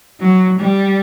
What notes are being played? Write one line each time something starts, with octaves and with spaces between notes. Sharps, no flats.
F#3
G3